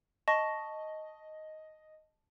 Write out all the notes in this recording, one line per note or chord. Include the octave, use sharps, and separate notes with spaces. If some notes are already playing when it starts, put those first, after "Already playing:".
D#5 A5 C#6 A#6